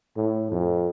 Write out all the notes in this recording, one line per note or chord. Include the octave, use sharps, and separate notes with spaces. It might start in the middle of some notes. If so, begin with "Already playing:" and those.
A2
F2